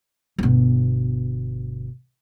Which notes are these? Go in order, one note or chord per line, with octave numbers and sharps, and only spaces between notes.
G1 B2